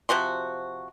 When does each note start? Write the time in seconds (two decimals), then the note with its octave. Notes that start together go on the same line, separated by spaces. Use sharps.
0.09 C3 F3 F#4 C6